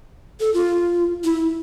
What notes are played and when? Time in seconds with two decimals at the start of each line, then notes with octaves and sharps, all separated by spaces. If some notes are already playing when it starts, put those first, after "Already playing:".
0.40 A4
0.54 F4
1.24 E4